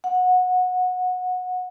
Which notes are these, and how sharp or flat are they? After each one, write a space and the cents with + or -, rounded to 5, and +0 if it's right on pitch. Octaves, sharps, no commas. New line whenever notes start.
F#5 -20